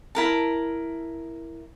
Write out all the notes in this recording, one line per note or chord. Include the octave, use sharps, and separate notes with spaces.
E4 A#4 A5